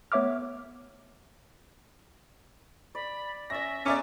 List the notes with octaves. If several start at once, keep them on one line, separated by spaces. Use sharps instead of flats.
A3 B3 C#5 E5 D6 F6
D5 B5
C#4 D5 E5 A#6
G#3 B3 C#4 A#4 D5 E5 D6